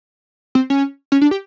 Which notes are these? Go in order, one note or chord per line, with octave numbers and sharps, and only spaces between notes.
C4
C#4
C#4
D4
G4